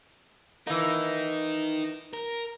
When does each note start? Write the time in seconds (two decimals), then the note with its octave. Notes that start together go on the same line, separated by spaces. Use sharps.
0.67 E3 A#3 D#4 A#4
2.13 A#4